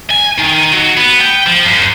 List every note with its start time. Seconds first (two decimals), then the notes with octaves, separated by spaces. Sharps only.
0.11 G#5
0.38 D#3
0.73 F#3
0.97 B3
1.21 G5
1.47 F3
1.66 F#2